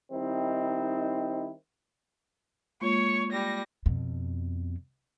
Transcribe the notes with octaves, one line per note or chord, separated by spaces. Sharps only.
D#3 G3 C4 D#4 E4
G#3 A#3 F4 C#5 C#6
G3 A#6
F2 B2